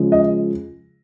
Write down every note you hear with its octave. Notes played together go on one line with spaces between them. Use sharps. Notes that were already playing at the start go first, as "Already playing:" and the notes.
Already playing: C#3 F3 G#3
D#5